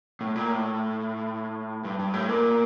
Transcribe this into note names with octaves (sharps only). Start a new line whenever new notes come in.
A2
A#2
A2
G2
G2
A2
A#2